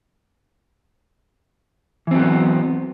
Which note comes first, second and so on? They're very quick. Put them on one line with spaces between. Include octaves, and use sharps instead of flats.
E3 C4 F#3 B3